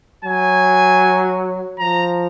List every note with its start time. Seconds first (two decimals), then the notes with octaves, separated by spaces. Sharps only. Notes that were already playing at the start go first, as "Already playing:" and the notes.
0.25 F#3 G#5
1.79 F3 A#5